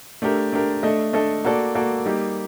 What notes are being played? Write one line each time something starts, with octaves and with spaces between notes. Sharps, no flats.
A3 D4 G4 A#4
A3 D4 G4 A#4
A3 D4 A4 D#5
A3 D4 A4 D#5
A#3 F#4 A4 D5
A#3 F#4 A4 D5
G3 A#3 D#4 G4